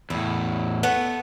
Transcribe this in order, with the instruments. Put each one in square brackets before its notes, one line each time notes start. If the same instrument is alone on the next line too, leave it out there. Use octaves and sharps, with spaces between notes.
[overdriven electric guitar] E2 A2 [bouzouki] E4
[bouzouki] A3 B3